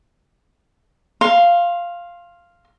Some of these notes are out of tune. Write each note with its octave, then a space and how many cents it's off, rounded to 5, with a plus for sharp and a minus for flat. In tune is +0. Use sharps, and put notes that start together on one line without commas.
F5 -5 C6 +25